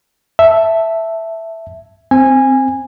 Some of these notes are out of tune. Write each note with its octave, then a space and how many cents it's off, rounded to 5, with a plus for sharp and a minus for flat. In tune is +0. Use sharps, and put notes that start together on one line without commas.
E5 +0 A5 +0
C4 +0 G#5 -15